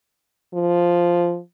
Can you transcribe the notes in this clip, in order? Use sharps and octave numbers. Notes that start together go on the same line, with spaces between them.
F3